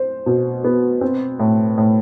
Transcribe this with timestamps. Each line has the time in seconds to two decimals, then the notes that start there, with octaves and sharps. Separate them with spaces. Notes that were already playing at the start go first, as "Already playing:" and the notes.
Already playing: C5
0.26 B2
0.64 B3
1.01 C4
1.39 A2
1.78 A2